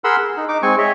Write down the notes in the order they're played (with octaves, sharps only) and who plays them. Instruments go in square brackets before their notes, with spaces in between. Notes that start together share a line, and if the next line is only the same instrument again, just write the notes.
[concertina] G#4 A#4 F#5 B5 C6 E6
G#4
D#4
D#4 D6
G#3 C4 G#5 C#6
G#4 C#5 D#5 E5